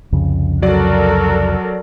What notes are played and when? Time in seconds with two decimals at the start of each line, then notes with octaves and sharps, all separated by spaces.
0.12 C2 F2 C#3
0.62 F#3 F#4 A4 A#4 D5